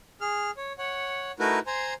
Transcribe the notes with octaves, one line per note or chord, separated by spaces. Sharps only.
G#4 F6
C#5
C#5 F#5
A3 D#4 E4 F#4 A#4 B4
C5 G#5 A#5 C6